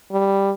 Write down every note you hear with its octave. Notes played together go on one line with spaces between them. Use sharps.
G3